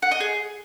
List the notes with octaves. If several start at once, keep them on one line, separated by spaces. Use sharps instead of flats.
F#5
D#5
G#4